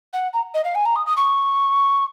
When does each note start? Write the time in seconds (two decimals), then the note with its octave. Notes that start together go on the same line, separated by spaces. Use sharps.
0.13 F#5
0.33 A#5
0.54 D#5
0.64 F5
0.75 G#5
0.85 A#5
0.95 D#6
1.06 D#6
1.16 C#6